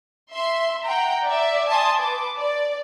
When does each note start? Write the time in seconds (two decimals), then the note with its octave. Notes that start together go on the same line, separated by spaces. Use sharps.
0.32 E5 C6
0.83 F#5 G5 A#5
1.25 D5 E5
1.68 G#5 A5 C6 D#6
1.98 B4 D6
2.37 D5